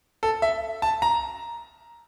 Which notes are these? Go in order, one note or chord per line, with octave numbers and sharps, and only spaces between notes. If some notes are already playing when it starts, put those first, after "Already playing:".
A4
E5
A5
A#5